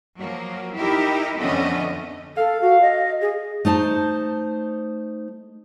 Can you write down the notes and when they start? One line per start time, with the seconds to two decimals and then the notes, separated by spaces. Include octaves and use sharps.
0.19 F3 F#3 A#3
0.77 D#4 E4 G4 A#4
1.39 F2 D3 A3 B3 C#4 D#5
2.37 A4 F5
2.62 F#4
2.81 D#5
3.21 G#4
3.65 A3 D#4 C5 A5